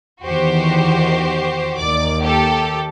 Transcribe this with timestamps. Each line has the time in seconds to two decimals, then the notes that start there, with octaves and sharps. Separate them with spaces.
0.23 E2 D#3 F#4 G4 C5
1.78 D#2 D#3 A#3 D5 D6
2.23 G4 A4